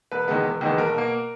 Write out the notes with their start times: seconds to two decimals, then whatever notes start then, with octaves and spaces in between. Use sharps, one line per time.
0.12 E1 B4
0.28 E2 D#3 G#3 B3
0.44 E1
0.61 E2 D#3 G#3 B3
0.78 B1 A#4
0.94 B2 A#3